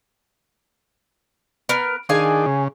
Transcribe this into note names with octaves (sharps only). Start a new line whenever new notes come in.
B3 A#4
D#3 D4 G#4 F5 G#5
C#3